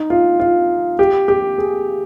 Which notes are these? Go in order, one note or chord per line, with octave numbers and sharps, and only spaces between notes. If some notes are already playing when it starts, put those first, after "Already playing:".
Already playing: D#4
F4
F4
G4
G4
G#4